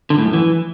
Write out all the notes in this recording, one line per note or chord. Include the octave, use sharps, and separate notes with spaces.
D3
A2
F#2
E3